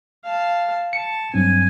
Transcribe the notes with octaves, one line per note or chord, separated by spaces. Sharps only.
F5 A5
A5 C#7
G2 F#3 C4 G#5